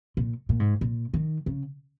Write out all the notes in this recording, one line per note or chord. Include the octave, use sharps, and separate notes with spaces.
A#2
A#2
G#2
A#2
D#3
C#3